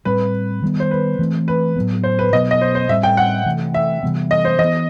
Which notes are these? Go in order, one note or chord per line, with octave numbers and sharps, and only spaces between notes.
A2 G3 C4 B4
D#3 G3 B3
C5
B4
E3 A3 C4
B4
A2 F#3 B3
C5
B4
B2 F#3 B3 D#5
D#5
C5
C5
A2 G3 C4 E5
G5
F#5
C3 E3 A3
E5
C3 E3 G3 B3
D#5
C5
E3 D#5
B3